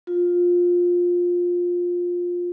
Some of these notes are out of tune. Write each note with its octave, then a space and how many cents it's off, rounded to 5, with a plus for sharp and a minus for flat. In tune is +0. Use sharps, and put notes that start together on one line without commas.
F4 +15